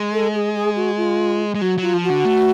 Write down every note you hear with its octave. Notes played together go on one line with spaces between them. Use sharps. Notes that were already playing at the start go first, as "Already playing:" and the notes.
Already playing: G#3
A4
G#4
G#4
F#4
F4
G#3
F#3 F#4
F#3 F4
F3
F#4
D3
A3